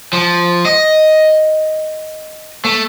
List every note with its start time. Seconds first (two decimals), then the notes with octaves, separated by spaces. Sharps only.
0.13 F3
0.65 D#5
2.65 A3